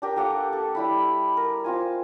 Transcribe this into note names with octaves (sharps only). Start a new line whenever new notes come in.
D4 G4 A#4
A#3 G4 A4 F#5
A4
G3 E4 B5
A#4
C4 F4 G#5